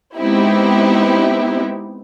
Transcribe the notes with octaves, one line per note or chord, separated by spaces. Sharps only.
G#3 B3 C4 D#4 E4 G4